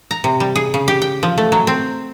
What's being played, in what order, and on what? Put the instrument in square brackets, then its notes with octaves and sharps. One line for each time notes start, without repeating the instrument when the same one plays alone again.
[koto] A#5
C3
G3
G#4
C#3
G4
G5
F3
A3
F#3
C4